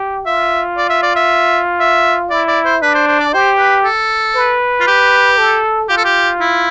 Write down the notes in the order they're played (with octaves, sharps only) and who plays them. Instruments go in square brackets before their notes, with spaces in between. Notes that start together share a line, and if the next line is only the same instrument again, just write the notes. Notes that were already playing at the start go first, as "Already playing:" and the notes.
Already playing: [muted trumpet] G4
[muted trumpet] F4 [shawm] E5
[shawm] D5
E5
D5
E5
E5
[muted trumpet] E4 [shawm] D5
[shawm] D5
C5
[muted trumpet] D4 [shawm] B4
[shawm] C5
C5
D5
[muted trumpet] G4 [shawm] C5
[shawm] B4
A4
[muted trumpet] B4
[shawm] F4
G4
[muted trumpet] A4
[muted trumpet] F4 [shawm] G4
[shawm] A4
G4
E4